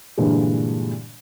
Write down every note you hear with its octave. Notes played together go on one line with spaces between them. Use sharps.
G2 A#2 D3 E3 G3 G#3